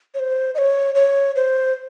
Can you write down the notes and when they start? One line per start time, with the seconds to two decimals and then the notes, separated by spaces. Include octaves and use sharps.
0.14 C#5
0.19 C5
0.55 D#5
0.58 C#5
0.95 C#5
1.36 C5